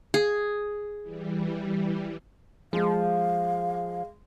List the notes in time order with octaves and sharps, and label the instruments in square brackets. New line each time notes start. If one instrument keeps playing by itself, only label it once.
[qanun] G#4
[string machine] E3 G3
[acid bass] F3 [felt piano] G#3 [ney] F5